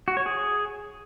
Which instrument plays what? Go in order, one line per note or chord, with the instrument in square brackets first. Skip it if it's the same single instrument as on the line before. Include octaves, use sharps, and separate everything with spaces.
[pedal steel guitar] F#4
C#5
G#4